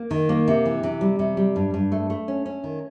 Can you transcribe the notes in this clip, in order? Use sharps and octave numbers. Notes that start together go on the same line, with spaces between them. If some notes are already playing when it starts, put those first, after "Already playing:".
Already playing: A#3
D#3
A#3
C3
E3
C3
G3
C3
G3
G2
G2
A3
A3
C#4
C#4
D#3